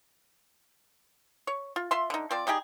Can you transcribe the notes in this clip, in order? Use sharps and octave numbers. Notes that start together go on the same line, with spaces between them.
C#5
F4
F4 E5 C6
D3 D#4
F3 C4 D5
G3 D#4 G4 G#4